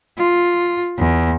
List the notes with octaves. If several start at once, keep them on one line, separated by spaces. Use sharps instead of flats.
F4
E2